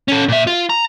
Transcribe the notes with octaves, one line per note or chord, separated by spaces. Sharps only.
C#4 A4
A#2 E5
F4
A#5